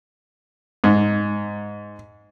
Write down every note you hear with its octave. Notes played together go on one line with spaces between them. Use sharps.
G#2